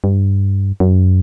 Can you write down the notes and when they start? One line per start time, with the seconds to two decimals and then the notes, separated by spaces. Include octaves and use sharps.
0.04 G2
0.80 F#2